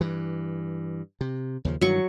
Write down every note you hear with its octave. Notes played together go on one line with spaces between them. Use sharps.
G2 E3
C3
D#2 C#3 F3
G2 D#3 E3 F#3 C#6